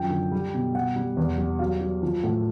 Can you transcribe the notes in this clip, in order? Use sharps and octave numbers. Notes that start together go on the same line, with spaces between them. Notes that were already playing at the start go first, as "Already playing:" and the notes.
Already playing: F#2 F3 G5
D3
G3
B2
G3 F#5
G3
E2
G3
F#3 F5
F#3
F3
A2